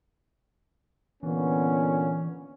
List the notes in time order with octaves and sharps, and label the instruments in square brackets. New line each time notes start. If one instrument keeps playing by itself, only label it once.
[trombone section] A#2 D3 B3 [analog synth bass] E3 [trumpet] C#4